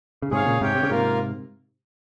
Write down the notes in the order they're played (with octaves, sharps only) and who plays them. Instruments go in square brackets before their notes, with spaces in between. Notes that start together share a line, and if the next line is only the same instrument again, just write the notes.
[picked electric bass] C#3
[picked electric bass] G#2 C3 [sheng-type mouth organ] G#4 C#5 F5
[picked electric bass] A#2 C#3
[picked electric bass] G#2 C3 [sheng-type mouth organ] G4 C#5 G5
[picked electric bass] C3
C#3
[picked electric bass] G#2 C3 [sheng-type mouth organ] A#3 F4 A#4